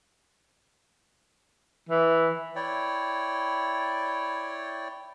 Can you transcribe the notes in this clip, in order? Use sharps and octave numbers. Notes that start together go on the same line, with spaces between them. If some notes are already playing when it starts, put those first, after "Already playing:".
E3
E4 C#5 D5 G5